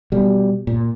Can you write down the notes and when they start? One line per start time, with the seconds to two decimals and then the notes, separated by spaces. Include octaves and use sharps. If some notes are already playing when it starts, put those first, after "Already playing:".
0.12 B2 G3
0.67 A#2